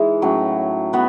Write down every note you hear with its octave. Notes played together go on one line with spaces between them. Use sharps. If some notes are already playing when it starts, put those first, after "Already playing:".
Already playing: E3 G#3 D#4
A2 F#3 C#4
B3 F#4 B4